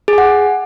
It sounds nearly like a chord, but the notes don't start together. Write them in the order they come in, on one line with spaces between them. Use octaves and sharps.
G#4 G#5 F#5